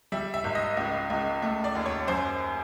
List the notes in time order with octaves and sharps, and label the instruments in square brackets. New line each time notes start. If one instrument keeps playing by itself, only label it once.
[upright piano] G3 E5
E5
G#1
D#5
C#2
C#2
A3
D5
D#2
C#5
F#2 C5